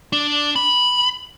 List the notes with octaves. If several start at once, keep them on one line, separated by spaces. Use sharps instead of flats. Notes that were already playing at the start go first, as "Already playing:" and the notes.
D4
B5